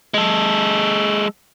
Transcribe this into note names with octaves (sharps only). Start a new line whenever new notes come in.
G#3 A4